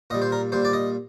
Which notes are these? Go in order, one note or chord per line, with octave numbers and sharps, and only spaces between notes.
A#2 G3 D#5
C5
A#4
A#2 G3 C5
D5
D#5